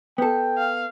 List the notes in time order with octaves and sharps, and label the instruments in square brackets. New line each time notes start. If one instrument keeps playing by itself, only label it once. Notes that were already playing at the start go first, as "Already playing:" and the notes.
[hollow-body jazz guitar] B3 A4 [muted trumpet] G5
[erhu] F5